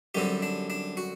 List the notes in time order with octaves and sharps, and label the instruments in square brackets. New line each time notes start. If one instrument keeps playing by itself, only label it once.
[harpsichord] F#2 D3 G3 C4 G4
D4
D4
F#4